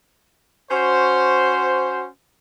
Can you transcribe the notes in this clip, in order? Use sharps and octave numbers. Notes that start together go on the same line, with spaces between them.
C#4 F#4 C5